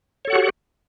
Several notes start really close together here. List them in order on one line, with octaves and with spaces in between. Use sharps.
C#5 A4 F#5 F#4 G4